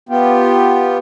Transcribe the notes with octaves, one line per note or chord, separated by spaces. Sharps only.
B3 F4 G4